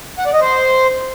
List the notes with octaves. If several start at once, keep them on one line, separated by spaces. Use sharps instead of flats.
F#5
D5
D#5
C5